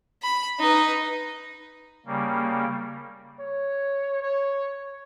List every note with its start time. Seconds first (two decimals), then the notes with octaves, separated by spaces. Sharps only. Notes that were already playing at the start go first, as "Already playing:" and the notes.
0.22 B5
0.60 D#4 B4
2.06 C#3 G3 A#3
3.40 C#5
4.22 C#5